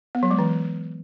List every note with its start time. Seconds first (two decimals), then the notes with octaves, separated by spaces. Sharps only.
0.15 B3
0.23 F#3
0.31 G#3
0.39 E3